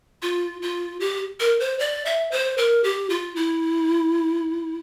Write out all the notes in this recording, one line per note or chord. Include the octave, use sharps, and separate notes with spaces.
F4
F4
G4
A#4
C5
D5
E5
C5
A#4
G4
F4
E4